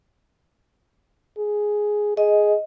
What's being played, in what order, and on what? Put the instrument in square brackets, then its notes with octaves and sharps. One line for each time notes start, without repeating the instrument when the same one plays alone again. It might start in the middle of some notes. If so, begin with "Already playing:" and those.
[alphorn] G#4
[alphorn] G#4 [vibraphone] D#5